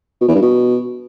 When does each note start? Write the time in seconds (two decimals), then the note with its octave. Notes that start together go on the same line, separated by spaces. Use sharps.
0.21 B2
0.28 E2
0.35 G2
0.42 B2